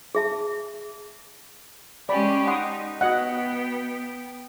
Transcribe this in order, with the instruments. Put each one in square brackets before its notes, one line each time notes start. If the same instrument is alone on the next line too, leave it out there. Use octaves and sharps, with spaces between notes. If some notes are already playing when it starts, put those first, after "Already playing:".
[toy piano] G#4 E5 A5
[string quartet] G#3 C#4 G4 [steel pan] D5 B5
[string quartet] D#4 [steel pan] F#5 C6 D#6
[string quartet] B3 G5 [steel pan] F#4 D#5 F#5